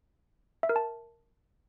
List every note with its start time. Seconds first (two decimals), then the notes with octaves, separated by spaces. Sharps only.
0.63 E5
0.69 A#4
0.76 A5